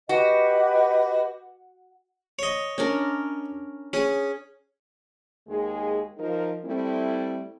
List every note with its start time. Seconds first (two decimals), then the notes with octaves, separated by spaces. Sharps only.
0.09 F#4 G4 B4 D#5
2.39 C#5 D#5
2.78 C#4 D4 A#4
3.93 C#4 G#4
5.48 D#2 D#3 G#3 G#4
6.17 F3 D#4 A#4
6.65 G3 A3 C4 E4